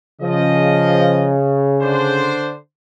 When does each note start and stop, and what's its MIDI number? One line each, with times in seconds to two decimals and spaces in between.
0.22 2.38 49
0.22 1.34 53
0.22 1.34 75
1.81 2.54 50
1.81 2.54 62
1.81 2.54 72